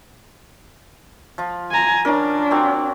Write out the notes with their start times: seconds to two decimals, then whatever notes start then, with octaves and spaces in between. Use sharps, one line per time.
1.38 F3 F4
1.71 G#5 A#5
2.05 C#4 D4 A#4
2.51 A#3 C4 F#4